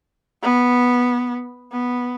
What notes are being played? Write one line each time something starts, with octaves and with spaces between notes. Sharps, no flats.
B3
B3